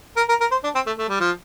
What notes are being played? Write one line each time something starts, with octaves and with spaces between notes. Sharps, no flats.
A#4
A#4
A#4
C5
D4
C4
A3
A3
G3
F3